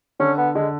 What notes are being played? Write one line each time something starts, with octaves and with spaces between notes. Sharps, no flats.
D3 C#4
B3
D3 G#3